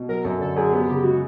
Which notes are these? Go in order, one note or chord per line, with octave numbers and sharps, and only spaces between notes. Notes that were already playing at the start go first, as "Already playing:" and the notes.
Already playing: B2
F#3 A#4
F#2 A4
D3 A4
F#2 G#4
B3 G4
C#3 G4
G#3 F#4